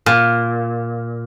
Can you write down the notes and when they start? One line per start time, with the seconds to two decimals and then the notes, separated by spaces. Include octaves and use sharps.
0.06 A#2